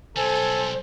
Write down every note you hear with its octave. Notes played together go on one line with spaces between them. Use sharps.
B1 G3 A4 C5 G#5